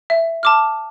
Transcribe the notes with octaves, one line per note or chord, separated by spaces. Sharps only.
E5
A5 D6 F6